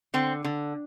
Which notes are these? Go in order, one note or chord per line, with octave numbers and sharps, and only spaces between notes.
D3 C4
D3